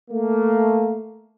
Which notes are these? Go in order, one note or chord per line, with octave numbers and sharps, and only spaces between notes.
A3 A#3